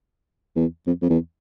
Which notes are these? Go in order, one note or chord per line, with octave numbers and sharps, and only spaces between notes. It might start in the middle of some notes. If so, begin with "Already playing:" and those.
E2
F2
F2
E2